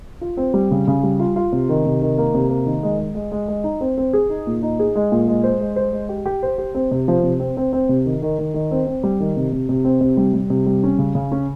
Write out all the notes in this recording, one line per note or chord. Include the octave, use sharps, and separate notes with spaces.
F4
C4
G3
C#3
C#3
G3
F4
F4
C3
D#3
C3
D#3
A#3
C3
A#3
D#3
G#3
G#3
G#3
G#3
G#3
D#4
C4
C4
G#4
D#4
A#2
D#4
G#4
G#3
A#2
G#3
C5
G#3
C5
G#3
G4
G4
C5
G4
C4
C3
F3
C3
C4
C4
C4
C3
D#3
D#3
D#3
D#3
C4
C4
G3
D#3
C3
C3
C3
C4
C3
G3
G3
C3
G3
C#4
C#3
C#3
C#4